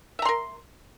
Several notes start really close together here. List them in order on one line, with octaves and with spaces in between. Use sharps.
E5 A#5 C6 A#4